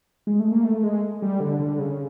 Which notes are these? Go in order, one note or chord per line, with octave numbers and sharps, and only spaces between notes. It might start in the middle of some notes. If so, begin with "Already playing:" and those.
G#3
A3
A#3
A3
G#3
G3
D3
D3
C#3